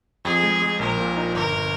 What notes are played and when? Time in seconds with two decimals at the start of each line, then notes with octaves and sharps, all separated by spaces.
0.25 F2 G#4
0.43 G#3
0.62 G#3
0.79 A#1 A#4
0.98 A#2
1.16 D#4
1.34 G1 A#4
1.52 G1